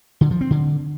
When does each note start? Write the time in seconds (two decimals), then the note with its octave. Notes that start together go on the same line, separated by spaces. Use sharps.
0.21 D3
0.31 F3
0.41 C4
0.51 D3